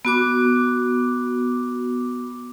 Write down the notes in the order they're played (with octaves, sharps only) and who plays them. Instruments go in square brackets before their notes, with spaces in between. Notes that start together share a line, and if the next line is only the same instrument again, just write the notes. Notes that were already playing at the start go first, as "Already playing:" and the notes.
[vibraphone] B3 F#4 D6